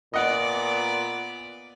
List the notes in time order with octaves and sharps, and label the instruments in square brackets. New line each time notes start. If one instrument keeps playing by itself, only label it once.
[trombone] A#2 [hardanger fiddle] B3 D5 [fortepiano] D#5 F#5